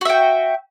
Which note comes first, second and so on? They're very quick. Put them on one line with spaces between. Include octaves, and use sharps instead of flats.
F#4 E5 G5